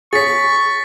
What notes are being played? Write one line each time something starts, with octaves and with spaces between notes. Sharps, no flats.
G#4 C#5 C#6 A6 B6